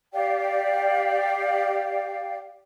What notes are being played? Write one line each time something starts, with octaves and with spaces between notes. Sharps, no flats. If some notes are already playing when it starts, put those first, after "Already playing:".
G4 D5 F5 G5